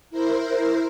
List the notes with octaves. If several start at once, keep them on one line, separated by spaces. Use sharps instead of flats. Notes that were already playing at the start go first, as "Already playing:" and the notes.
E4 A#4 C5